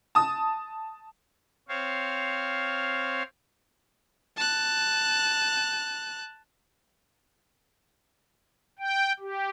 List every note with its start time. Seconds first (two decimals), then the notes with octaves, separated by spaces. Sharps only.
0.15 A5 D#6
1.69 C4 C#5 F5
4.37 A5 F#6
8.79 G5
9.20 G4